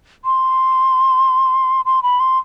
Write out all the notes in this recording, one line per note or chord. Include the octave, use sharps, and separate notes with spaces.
C6
C6
B5
C6